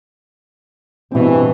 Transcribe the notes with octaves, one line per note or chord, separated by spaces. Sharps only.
G2 B2 E3 C4